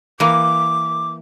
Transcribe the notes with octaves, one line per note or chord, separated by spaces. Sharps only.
E3 A#3 D6